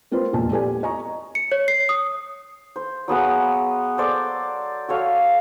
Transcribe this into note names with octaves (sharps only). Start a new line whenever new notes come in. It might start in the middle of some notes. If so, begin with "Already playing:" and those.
A#3 C4 F4 B4 C5
E1 F2 A#2 F4 A5
B3 G4 A4 B4 D5 G#5
D#5 G#5 A#5 C#6
C#7
C#5
C7
D#6
C5
F#3 B3 G#4 F#5
A4 C5 D5 D6
F#4 A4 C#5 F5